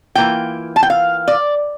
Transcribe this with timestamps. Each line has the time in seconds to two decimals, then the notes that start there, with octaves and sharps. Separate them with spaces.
0.15 E3 A#3 F4 G5
0.76 A5
0.83 G5
0.90 F5
1.28 D5